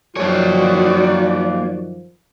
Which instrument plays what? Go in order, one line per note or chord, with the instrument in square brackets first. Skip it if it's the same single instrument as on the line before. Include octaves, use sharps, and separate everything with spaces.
[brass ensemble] F#2 D#3 F3 [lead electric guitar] A#3 C#5 [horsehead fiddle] F#4 D5